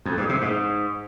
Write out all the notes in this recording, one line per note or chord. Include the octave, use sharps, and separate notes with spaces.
F2
G2
C3
G#2